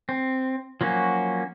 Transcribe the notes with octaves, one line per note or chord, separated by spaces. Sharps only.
C4
F3 F#3 A#3 C#4 F#4